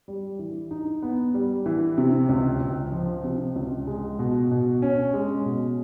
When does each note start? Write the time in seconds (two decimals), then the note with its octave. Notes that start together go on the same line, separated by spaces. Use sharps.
0.08 G3
0.39 E3
0.71 D#4
1.03 B3
1.34 G3
1.66 E3
1.98 C3
2.29 C#2
2.61 C#2
2.92 F3
3.24 C3
3.56 C#2
3.87 G#3
4.19 B2
4.51 B2
4.82 C#4
5.14 G#3
5.46 B2